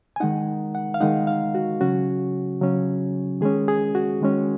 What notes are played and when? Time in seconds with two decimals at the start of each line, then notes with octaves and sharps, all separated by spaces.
0.16 G#5
0.20 D#3 G#3 D#4 F#5
0.75 F#5
0.94 F5
1.01 D#3 G#3 D#4 F#5
1.27 F5
1.55 F#4
1.81 C#3 F#3 C#4 F#4
2.61 C#3 F#3 C#4
3.41 D#3 G#3 C#4 G#4
3.68 G#4
3.95 F#4
4.21 D#3 G#3 C#4